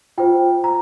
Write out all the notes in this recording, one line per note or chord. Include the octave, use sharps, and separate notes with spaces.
F4 C5 G5
A#5